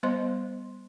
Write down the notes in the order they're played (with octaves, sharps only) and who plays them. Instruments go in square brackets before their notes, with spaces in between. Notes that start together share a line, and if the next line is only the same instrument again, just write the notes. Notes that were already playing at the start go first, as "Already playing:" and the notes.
[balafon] G3 B3 C5 D#5 C6